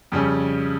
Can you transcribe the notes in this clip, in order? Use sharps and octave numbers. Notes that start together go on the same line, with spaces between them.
F2 C#3 G3 C#4